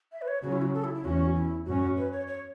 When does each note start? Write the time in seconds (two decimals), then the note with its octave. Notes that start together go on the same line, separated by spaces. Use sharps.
0.12 E5
0.22 B4
0.28 C#5
0.43 C#3 F#3 C#4 F#4
0.52 E4
0.62 F#4
0.74 A4
0.84 E4
0.95 E4
1.05 E2 E3 C#4 F#4
1.35 E4
1.66 F#2 F#3 C#4 F#4
1.97 B4
2.12 C#5
2.27 C#5